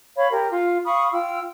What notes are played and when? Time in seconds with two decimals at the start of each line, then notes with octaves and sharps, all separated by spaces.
0.16 C#5 F5 B5
0.31 G4 A#4
0.50 F4
0.85 F5 B5 C#6 D#6
1.13 F4 G5 E6